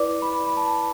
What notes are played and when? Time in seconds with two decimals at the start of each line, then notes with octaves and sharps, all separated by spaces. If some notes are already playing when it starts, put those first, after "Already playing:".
Already playing: E4 B4 D5 D6
0.22 B5
0.47 B5
0.57 A5